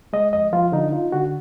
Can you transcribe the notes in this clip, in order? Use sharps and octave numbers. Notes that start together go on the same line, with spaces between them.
G#3 D#5
F2 D#5
F3 F4
D3 D#4
D#4 F4
D3 F#4